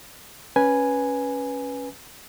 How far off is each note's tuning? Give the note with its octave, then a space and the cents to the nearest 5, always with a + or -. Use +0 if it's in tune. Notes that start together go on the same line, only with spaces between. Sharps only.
C#4 +0 B4 -10 G#5 +0